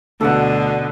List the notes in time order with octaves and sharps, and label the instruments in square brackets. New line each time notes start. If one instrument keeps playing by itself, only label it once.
[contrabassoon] D2 [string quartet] B2 D3 [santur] A4 F#5